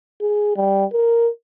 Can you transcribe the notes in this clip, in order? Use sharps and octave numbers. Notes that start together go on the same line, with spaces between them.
G#4
G3
A#4